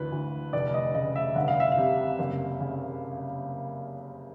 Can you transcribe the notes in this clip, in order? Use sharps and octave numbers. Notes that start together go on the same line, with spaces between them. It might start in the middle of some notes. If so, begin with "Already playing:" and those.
Already playing: G#1 D2 E3 B4
D2
F1 D5
D#5
C#3 D#5
E5
G1 F#5
F5
E5
F5
C3
F#1
C#3